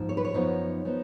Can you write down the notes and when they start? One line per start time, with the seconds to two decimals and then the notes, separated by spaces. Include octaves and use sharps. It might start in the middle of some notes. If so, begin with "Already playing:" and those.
Already playing: G#2 F3 A#3
0.09 C#5
0.17 B4
0.24 C#5
0.34 F#2 F3 B3 D#4
0.85 F3 B3 D#4